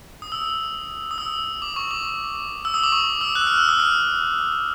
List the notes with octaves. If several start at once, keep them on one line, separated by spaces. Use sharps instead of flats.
D#6
E6
D#6
E6
D6
C#6
D6
E6
D#6
D6
C#6
E6
F#6
E6
F6
E6
D#6
F6